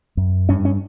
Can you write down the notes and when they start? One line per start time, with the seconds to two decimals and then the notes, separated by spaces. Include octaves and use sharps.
0.17 F#2
0.49 G2 C#4
0.65 C#4